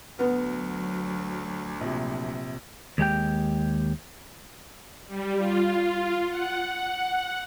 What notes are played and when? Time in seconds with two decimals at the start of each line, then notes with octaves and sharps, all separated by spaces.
0.19 D2 F#3 B3
1.81 A#1 C3
2.98 D#2 G#3 G4 G5
5.07 G3
5.38 F4
6.29 F#5